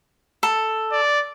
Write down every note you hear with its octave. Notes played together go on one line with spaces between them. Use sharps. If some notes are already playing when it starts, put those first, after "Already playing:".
A4
D5